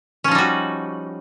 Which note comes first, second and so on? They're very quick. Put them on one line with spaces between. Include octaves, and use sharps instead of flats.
C#4 F3 D#4 G3 F#4